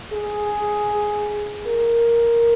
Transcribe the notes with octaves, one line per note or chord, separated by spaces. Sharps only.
G#4
A#4